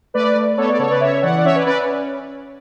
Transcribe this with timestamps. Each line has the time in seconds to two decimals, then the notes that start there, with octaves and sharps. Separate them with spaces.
0.14 A3 B4 D5
0.35 A3
0.57 B3 A4 C#5
0.69 D5
0.79 C#3 A4 C#5
0.90 B4 D5
1.01 C#4 C#5 E5
1.22 E3 D5 F#5
1.38 D5
1.45 C#4 C#5 E5
1.55 B4 D5
1.66 C#4 B4 D5